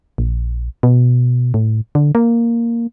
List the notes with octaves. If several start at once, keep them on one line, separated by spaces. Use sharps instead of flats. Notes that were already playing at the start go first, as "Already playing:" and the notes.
A#1
B2
A2
D3
A#3